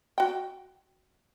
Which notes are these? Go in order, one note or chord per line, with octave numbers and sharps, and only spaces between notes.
F#4 G5